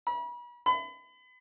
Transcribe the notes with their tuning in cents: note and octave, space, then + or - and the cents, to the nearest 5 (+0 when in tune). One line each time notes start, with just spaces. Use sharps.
B5 -40
B5 +35